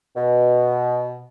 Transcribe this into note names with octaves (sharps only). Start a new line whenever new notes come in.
B2